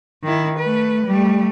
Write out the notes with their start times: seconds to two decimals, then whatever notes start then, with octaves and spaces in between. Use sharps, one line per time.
0.23 D#3 E4
0.58 A3 B4
1.06 G3 A3